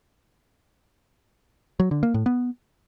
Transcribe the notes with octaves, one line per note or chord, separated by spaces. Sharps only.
F#3
D3
A#3
A2
B3